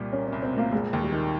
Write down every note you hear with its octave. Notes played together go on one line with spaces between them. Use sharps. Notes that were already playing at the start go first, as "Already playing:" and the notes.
Already playing: C2 A#2 G3
A#3 C#4
C2 C#4
C4
A#2 A#3
F1 G#3
D#2
G3
D#3